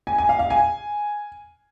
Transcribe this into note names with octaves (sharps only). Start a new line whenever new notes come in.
G#5
G#5
F5
F5
G#5